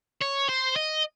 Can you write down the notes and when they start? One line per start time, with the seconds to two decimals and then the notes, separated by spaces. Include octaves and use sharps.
0.21 C#5
0.49 C5
0.76 D#5